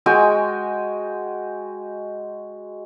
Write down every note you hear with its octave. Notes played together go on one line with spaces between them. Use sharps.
G#3 F#4 G5 G#5